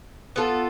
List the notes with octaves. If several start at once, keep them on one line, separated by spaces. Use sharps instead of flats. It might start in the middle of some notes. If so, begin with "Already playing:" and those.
B3 F4 A4